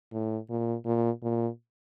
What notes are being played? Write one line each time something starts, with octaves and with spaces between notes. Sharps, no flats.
A2
A#2
A#2
A#2